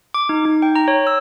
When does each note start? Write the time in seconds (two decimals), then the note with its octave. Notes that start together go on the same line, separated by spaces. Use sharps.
0.14 D6
0.29 D#4
0.45 D#4
0.62 G5
0.76 A#5
0.88 C#5
1.07 E6